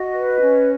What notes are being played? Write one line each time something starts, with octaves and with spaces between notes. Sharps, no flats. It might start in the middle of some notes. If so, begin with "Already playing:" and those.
Already playing: F#4 D#5
B4
C#4